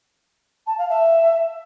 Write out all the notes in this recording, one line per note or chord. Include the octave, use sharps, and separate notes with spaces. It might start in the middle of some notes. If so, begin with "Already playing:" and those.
A5
F5
E5